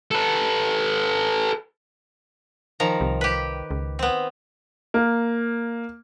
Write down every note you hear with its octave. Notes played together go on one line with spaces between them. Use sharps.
A4 B4
D#3 F3 A#5
C2
G4 B4
C#2
B3 C4
A#3